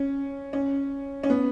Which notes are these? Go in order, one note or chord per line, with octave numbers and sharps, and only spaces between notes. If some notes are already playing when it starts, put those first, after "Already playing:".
Already playing: C#4
C#4
C#4
B3